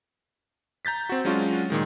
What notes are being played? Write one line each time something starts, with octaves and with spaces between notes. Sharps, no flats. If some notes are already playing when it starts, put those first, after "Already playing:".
A#5 G6 A6 B6
C4 F#4
F#3 G#3 C#4 D4 F4 F#4
A#2 D#3 G#3